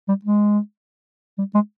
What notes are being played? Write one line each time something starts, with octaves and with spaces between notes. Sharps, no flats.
G3
G#3
G3
G#3